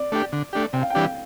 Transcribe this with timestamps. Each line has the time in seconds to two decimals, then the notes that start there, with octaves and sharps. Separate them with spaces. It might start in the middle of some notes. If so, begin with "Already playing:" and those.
Already playing: D5
0.12 A3 D4 G4
0.33 D3
0.53 A3 D4 G4
0.73 C3 G5
0.82 F5
0.90 G5
0.95 E3 G3 D4 G4